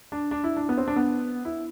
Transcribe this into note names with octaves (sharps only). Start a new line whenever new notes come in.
D4
D4
E4
D4
B3
C4
D4
B3
E4